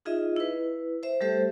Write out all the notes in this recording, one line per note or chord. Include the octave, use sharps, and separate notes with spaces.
D#4 F4 G#4 D#5 E5
E4 B4
C5 E5
G3 A3 G4 A4 C5 E5